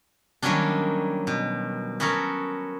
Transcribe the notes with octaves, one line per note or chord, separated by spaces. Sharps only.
D#3 F#3 G3 A#3 C#4 D4
B2
B3 C#4 F#4 A4 A#4